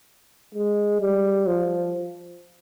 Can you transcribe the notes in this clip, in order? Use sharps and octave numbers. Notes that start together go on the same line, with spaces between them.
G#3
G3
F3